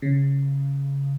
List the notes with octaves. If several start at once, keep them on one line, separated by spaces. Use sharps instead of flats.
C#3